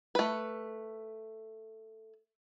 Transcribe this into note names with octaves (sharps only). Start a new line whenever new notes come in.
A3 B4